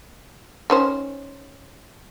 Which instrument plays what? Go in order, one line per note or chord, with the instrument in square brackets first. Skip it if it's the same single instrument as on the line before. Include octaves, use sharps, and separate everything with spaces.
[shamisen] D#3 C#4 C5